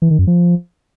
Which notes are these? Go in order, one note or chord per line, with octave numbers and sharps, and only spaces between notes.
E3
D#3
F#2
F3